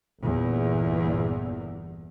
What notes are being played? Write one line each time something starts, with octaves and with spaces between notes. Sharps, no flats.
G1 E2 A#2